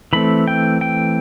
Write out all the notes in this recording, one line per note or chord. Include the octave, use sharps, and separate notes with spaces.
E3 A3 C4 B5
G5
G5